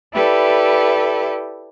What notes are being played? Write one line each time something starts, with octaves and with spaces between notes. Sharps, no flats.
E4 G4 A4 B4 D5